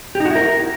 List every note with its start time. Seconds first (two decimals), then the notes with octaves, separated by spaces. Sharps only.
0.15 G4
0.20 D#4
0.25 F#4
0.30 E4
0.36 A#4